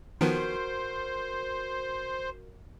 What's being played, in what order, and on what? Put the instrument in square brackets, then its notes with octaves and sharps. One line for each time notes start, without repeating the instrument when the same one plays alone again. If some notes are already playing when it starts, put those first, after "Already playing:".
[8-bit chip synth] D#3 F3 B3 [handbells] F#4 A#4 D7 [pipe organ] C5